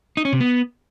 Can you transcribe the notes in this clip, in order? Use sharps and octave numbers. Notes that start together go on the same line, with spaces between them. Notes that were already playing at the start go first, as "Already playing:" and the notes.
D#4
C#4
C3
B3